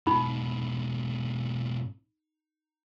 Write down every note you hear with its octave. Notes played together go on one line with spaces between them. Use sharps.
G#2 B2 D#4 B5